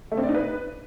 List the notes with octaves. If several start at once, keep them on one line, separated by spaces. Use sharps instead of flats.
A3
C4
D5
D#4
B4